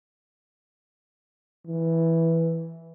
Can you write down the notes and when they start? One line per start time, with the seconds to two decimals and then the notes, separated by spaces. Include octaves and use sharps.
1.67 E3